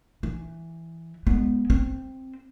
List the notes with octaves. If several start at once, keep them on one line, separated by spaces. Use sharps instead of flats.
E3
G#3 B3
C4